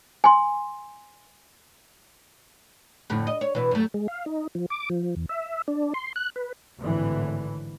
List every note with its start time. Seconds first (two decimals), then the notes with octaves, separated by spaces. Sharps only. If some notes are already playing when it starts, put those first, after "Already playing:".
0.24 G#5 C6
3.10 F2 A2 D3
3.27 D#5
3.41 C#5
3.55 B2 E3
3.71 F#2 A3
3.94 G#3
4.08 F5
4.26 D#4
4.55 F3
4.70 D6
4.90 F3
5.16 E2
5.29 E5
5.68 D4
5.94 C6
6.16 F#6
6.36 B4
6.80 G#1 A2 D3 E3